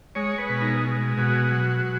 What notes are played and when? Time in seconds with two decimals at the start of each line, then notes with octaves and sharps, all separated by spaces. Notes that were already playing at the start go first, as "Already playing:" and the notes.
0.15 G#3 C#5
0.38 B4
0.49 B2
0.62 D#4
0.84 G#3
1.17 B2 F#4
1.51 F#3